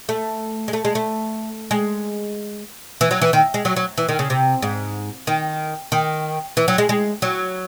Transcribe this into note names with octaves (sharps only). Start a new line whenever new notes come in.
A3
G#3
A3
G#3
A3
G#3
E3
F#3
E3
D#3
G#3
F#3
F#3
E3
D#3
C#3
C3
G#2
D#3
D#3
E3
F#3
G#3
G#3
F#3